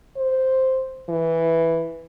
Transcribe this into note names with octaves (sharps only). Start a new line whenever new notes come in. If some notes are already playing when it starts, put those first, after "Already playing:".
C5
E3